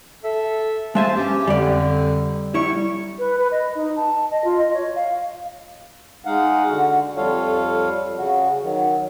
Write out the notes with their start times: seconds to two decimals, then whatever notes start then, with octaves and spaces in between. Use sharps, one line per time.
0.24 A4 E5
0.95 G#3 C5 E5 F5 G#5 A5
1.15 G2 C#4 G4
1.48 F2 D3 G3 D5
2.54 F#3 G3 E4 C#6
3.18 B4
3.38 B4
3.51 D#5
3.75 D#4
3.96 A5
4.31 D#5
4.44 F4
4.58 D#5
4.74 C#5
4.95 F5
6.25 G#3 D#4 F5 F#5
6.68 D3 F#4
7.17 F2 G3 F4 A4 C#5 F5
8.18 C#3 F#4
8.63 D#3 F#3